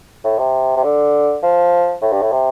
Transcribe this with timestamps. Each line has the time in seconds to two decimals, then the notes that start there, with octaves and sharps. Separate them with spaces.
0.24 A2
0.39 C3
0.76 C3
0.84 D3
1.43 F3
2.02 A2
2.12 G2
2.22 A2
2.32 C3